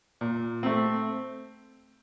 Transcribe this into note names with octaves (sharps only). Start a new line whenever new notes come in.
A#2
A3 C4